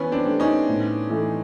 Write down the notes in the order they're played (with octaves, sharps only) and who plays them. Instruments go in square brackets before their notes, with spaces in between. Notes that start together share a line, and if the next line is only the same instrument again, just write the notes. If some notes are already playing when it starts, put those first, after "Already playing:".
Already playing: [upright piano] E3 [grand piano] B3 C#4
[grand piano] C4 D4
[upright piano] A3 D4 G4
[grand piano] C#4 D#4
[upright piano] A2
E3 A3